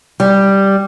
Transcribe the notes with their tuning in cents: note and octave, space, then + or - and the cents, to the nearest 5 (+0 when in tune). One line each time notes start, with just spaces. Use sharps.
G3 +0